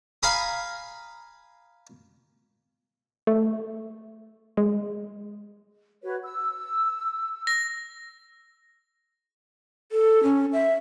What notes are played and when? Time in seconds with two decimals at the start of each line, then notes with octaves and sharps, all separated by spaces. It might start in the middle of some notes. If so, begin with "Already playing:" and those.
0.23 F5 G#5 A#5 B5 D#6
3.27 A3
4.57 G#3
6.03 F#4 B4 C#5
6.23 E6
7.47 A#6
9.92 A4
10.23 C#4
10.53 E5